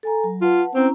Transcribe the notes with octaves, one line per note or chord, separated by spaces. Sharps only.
A4 G#5 A#5
F#3
F4 B4 F#5 A5
C4 C#4 E4 A#5